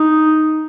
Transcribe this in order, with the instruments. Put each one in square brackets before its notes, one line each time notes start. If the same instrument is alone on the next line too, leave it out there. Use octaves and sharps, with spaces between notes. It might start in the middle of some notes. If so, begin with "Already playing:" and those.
Already playing: [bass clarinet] D#4